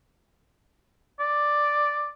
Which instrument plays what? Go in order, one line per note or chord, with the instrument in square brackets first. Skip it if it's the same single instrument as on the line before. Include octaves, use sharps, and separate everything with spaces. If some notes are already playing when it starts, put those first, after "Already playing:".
[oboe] D5